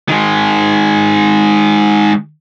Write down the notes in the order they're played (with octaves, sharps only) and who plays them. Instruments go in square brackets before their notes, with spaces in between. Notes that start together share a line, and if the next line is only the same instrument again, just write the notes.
[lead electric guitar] D#3 G#3